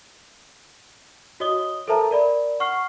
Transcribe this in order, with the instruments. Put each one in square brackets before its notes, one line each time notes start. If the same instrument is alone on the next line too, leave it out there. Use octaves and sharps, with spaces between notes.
[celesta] F#4 C#5 D#5 D#6 G7
A4 A#4 C5 E5 A5 A#5
A#4 D5 B5
F#5 C#6 F6 C7